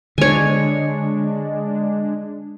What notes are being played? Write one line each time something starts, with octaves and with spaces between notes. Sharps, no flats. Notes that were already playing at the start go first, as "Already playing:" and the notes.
D3 G#3 D4 C#5 G#5